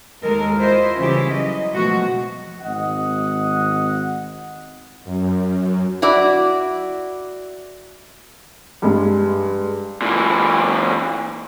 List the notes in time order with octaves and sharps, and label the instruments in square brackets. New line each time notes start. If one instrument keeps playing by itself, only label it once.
[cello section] D#2 G#3 A4 A#4
E4 F4 C5 D#5
C#3 E3 G3 C#4 E4 G4
F#3 D#5
B2 F3 F#3 G#3 A3 F#4
[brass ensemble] G#1 D#5 F#5
[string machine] F#2
[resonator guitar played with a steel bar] E4 F#4 D5
[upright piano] G2 G#3
[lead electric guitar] A#2 E3